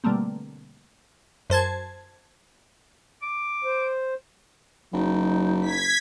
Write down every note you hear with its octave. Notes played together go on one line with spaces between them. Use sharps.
B2 D3 G3 A3 A#3 C4
F#2 C5 A5 G#6
D6
C5
F#1 F#3 D#4
G#6 B6